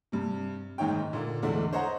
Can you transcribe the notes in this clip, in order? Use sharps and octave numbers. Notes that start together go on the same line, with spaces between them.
G2 C3
F#1 G#2 D#3 D#4 C#5 G5
A#2 D3 A#3
E2 G#2 D3 A3 D4 E4
C5 C#5 D#5 F#5 A#5